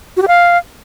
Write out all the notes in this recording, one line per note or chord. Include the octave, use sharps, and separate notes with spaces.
F#4
G4
F5